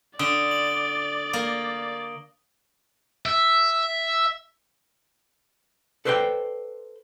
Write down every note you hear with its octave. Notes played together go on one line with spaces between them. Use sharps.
D3 D5 D#6 D7 G7
F#7
A#3
E5
A4 B4 C5 D5 F#5 G5